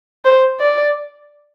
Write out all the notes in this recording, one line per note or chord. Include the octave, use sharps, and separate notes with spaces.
C5
D5